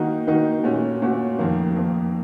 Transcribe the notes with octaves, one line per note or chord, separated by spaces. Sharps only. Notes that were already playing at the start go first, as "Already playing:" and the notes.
Already playing: D#3 A#3 D#4 F#4
D#3 A#3 D#4 F#4
A#2 A3 C#4 F#4
A#2 A3 C#4 F#4
F2 D#3 A#3
F2 D#3 A#3